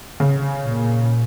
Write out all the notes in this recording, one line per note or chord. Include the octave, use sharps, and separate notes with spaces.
C#3
A#2